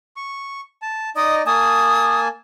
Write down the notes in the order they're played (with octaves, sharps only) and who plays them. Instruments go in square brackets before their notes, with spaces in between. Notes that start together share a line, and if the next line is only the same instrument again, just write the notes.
[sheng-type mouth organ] C#6
A5
[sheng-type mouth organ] D#4 D5 D#5 [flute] D#6
[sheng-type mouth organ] A#3 G#5 A5 [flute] D#6